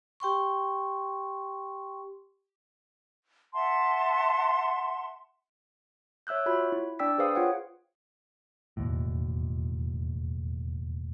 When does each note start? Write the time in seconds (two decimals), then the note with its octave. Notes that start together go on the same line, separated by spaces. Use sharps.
0.20 G4 G5 C6 C#6
3.54 E5 F#5 A5 C6
6.27 C#5 E5 E6 F#6 G6
6.46 F4 F#4 C#5 B5
6.72 E4
6.99 D4 D5 G5 E6 B6
7.18 G#4 B4 C5 F5 D#6
7.35 F4 C#5 F#5 G5
8.77 E1 D#2 A2